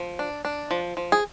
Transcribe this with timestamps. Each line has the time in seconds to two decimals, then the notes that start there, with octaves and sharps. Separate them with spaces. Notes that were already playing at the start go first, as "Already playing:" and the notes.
Already playing: F3
0.19 D4
0.45 D4
0.71 F3
0.97 F3
1.12 G#4